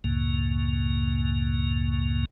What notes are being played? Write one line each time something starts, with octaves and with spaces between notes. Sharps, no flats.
C#2 F#2 A2 C#3 A#3